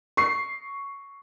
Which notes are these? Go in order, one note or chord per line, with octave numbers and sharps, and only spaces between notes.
C#6 C7